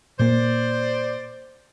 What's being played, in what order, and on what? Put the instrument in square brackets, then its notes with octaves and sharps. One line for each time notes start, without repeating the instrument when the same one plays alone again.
[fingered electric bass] A#2 A#3 [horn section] C5 D5